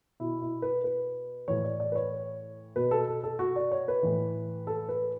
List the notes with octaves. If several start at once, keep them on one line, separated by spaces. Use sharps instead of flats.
B2 E4
E4
B4
B4
A2 E3 C#5
D5
D5
B4
C#5
B2 B4
A4
A4
A4
F#4
D5
C#5
B4
A2 E3
A4
B4